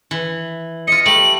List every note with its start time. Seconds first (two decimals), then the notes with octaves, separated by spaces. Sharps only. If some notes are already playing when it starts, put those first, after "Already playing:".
0.11 E3
0.87 F4 D#5 C#7
1.06 G3 A3 F#7